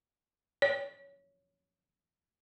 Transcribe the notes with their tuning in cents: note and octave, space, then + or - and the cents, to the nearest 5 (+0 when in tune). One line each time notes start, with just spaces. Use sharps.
C#5 +15